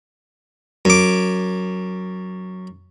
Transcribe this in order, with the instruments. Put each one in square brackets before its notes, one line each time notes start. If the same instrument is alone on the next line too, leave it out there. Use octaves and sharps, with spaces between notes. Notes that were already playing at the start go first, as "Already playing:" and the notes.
[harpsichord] F#2 D6